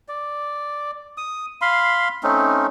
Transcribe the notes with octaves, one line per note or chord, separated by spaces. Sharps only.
D5
D#6
F5 B5 C6
A3 C4 C#4 D#4